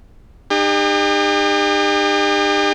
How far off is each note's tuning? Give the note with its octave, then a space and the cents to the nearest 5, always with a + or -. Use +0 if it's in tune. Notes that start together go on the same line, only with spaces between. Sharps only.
D#4 -40 G4 +40